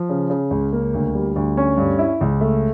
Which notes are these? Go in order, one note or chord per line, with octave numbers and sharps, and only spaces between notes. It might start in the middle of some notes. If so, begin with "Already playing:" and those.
Already playing: F3
C#3
C#3
C#2
A#3
D2
G3
D2
C#4
G2
E4
C#2
A3